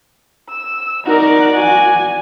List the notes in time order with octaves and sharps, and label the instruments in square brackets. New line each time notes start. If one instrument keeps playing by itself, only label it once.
[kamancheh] E6
[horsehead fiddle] D#4 A#4 [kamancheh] F#4 D5
[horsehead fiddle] G#5